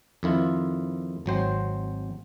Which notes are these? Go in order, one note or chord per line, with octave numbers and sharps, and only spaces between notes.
F2 D#3 E4 F4
G#1 F#3 C5 G5